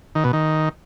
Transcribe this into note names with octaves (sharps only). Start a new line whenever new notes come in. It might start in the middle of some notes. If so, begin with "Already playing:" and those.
D#3
B2
D#3